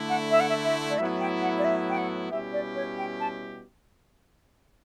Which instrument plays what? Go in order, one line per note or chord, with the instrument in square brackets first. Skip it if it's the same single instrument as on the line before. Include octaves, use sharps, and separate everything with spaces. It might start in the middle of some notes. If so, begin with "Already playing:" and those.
Already playing: [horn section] D3 A3 E4
[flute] F#5
E5
F#5
E5
E5
D5
[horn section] A2 F#3 B3 E4 [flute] E5
[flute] G5
F#5
D5
E5
G5
F#5
[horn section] B2 G3 C#4 E4 G4 [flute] E5
[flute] D5
C#5
G5
A5